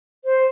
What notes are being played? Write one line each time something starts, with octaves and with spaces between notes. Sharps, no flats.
C5